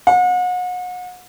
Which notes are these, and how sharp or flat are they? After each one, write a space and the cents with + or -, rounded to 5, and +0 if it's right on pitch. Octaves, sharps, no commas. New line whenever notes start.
F#5 -35